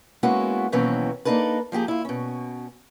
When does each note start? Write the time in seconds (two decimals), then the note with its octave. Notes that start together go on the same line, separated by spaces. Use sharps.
0.23 G#3 A#3 B3 C#4 E4 F#4
0.72 D#2 B2 E3 F#3 C4 C#4
1.25 A#3 C4 D4 D#4 A4 B4
1.72 F3 A#3 G4 G#4
1.88 E4 F4
2.05 B2 C#4